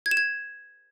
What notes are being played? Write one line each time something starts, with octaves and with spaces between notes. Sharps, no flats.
G#6
E7
G#6